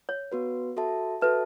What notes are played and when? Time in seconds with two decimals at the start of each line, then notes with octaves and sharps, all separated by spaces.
0.09 C#5
0.32 B3 F#4 B4
0.77 F#4 A4 E5 A5
1.21 F#4 A4 B4 E5 A5